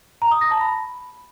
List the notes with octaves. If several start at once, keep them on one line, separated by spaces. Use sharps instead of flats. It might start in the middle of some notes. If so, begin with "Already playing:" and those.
A#5
D#6
A#6
A5
B5